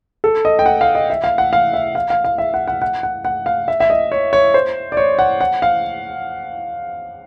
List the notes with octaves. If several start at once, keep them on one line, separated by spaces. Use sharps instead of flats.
A4
D#5
G5
F#5
F5
D#5
E5
F5
F#5
F5
E5
F5
F5
F5
E5
F#5
F#5
F#5
F#5
F#5
F5
E5
E5
D#5
C#5
C#5
C5
D5
C#5
F#5
F#5
F5